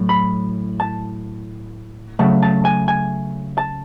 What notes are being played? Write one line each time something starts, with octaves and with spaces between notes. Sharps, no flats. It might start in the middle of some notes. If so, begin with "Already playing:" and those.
Already playing: A2 F#3
B5
A5
C#3 F#3 A3 A5
A5
G#5
G#5
A5